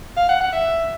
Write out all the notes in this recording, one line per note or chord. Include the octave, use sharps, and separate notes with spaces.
F5
F#5
F#5
E5